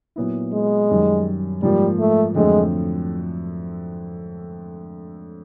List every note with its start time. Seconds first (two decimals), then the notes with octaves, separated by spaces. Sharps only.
0.16 A#2 F#3 B3 E4
0.53 G#3
0.90 F#2 D#3 G3
1.62 G#2 F3 G3 A#3
2.00 A3
2.35 F2 D3 F#3 G#3 A3 C4